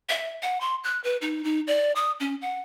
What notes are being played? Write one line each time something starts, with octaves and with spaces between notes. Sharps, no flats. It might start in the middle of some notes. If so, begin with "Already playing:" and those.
E5
F#5
C6
F#6
B4
D#4
D#4
D5
D#6
C#4
F#5